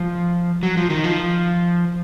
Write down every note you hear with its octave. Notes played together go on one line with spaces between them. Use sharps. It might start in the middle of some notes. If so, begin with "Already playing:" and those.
Already playing: F3
F#3
F3
D#3
F3